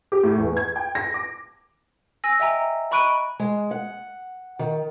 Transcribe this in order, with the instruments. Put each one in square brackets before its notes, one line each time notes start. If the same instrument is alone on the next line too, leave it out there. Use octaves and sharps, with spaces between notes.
[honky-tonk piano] G4
A2
E2
G#6
G5
A#6
D6
[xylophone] G#5 E6 A#6
D#5 E5 G5 G#5 A#5
D#5 B5 C#6 F#6 D7 D#7
[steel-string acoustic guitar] G#3
F#5
D#3